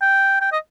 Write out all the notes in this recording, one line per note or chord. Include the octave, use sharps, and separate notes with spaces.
G5
G5
D#5